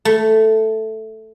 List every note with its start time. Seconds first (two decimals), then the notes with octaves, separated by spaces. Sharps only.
0.05 A3